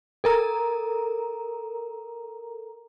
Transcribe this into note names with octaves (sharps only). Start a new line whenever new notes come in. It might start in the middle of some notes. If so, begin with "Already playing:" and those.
A4 A#4 A#5